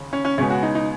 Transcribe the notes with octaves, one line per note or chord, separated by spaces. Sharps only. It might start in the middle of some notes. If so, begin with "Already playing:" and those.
Already playing: D#2 C#3
C#4
C#4
C#2 B2 G#3 B3 C#4
F#4
D#4
D#4